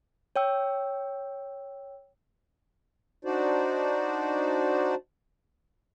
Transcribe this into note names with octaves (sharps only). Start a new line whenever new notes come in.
C#5 G5 E6
D4 D#4 F#4 C5 D5